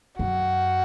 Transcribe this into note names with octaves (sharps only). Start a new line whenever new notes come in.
F#2 F#4